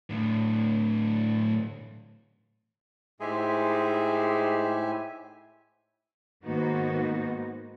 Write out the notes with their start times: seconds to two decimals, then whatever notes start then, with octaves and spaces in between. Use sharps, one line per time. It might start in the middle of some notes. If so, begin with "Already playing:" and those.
0.10 A2 D3
3.20 A2 G#3 D#4 G4 C5 E5 G#5
6.43 G#2 D#3 A#3 B3 D#4 F#4